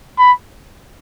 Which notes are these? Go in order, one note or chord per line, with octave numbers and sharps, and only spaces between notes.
B5